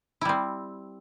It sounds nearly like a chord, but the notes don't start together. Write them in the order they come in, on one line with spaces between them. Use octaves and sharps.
E4 G3 C4